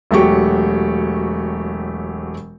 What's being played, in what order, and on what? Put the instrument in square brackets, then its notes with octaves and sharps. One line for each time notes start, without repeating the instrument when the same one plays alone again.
[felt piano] E1 F#3 A3 F#4 G4 C#6